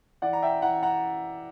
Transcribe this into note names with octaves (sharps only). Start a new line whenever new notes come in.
E3 D5 F#5
A#5
E5 G5
E3 F#5 A#5
F#5 A#5